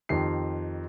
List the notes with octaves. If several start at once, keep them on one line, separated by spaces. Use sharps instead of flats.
F2 D#3 G4 C7